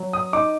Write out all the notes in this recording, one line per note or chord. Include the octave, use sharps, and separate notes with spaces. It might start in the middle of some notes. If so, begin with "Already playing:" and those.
Already playing: F#3
D#6
D#4 D6